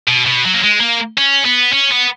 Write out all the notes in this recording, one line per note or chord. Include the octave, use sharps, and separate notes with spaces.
B2
B2
F#3
A#3
G#3
A#3
C#4
B3
C#4
B3